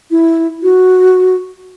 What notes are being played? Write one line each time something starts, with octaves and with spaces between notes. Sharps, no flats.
E4
F#4